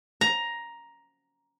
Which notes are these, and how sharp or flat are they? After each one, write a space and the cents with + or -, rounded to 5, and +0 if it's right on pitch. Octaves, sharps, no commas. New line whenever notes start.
A#5 +10